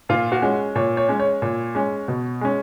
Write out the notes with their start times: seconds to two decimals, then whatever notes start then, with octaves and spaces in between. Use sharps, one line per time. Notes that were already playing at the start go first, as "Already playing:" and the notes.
0.09 A#2 F4
0.32 F#4
0.42 G#3 C#4
0.75 A#2 C#5
0.97 C#5
1.09 G#3 C#4
1.20 C#5
1.42 A#2
1.75 G#3 C#4
2.08 B2
2.41 G#3 C#4